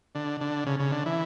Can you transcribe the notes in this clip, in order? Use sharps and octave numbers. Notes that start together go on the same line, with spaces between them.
D3
D3
C#3
C#3
D3
E3